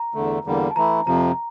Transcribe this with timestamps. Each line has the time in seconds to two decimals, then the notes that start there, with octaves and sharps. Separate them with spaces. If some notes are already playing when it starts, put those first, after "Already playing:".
Already playing: A#5
0.14 E2 D3 A3
0.45 E2 D3 G3 A#3
0.71 A5
0.76 E3 A3 E4 A#5
1.06 F2 C3 F3 A#5